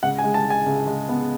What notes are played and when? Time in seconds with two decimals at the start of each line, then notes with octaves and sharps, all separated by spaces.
0.03 C#2 F#5
0.19 G#5
0.24 G#3
0.34 A5
0.45 G#3
0.50 G#5
0.66 C#2
0.87 G#3
1.09 B3